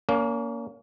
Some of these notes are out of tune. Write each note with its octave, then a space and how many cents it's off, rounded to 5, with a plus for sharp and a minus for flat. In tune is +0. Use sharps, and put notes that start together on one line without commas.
A#3 +0 C#4 +35